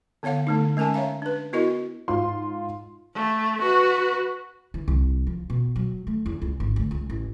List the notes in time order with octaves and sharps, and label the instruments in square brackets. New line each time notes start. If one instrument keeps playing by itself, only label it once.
[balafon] D3 B3 C#5 F5 F#5
D3 A3 D#4
G#3 C#4 A#4 G#5 A5
C#5 E5 F5 A#5
D4 B4
B3 E4 F#4 A#4 D#5
[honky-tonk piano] G#2 F4 C6
[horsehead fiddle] A3
F#4 B4
[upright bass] E3
C2
F3
B2
F#3
A3
E2
C#2
G#1
D2
C#2
A1